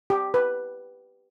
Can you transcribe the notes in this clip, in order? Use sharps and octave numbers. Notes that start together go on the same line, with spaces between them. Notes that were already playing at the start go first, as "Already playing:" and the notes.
G4
B4